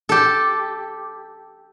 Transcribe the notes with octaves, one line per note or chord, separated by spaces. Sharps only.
G4 A4